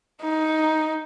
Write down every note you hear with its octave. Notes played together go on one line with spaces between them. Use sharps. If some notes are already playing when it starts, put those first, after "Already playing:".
D#4